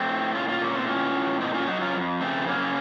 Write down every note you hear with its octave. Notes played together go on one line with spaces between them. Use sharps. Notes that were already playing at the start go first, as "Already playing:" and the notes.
Already playing: A3 C4
A2
A#2 C#4 F4
C#4 F4
A#2 A#3 C#4
A3 C4
A2 C#4 F4
A2
A#2 C4 D#4
C#4 F4
F#3 D#4 F#4
C#4 F4
F2
C#3 A3 C4
F#3 A#3 C#4